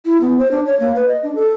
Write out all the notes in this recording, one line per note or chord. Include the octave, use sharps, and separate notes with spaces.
E4
B3
C5
D4
C#5
A#3
B4
D#5
D4
A4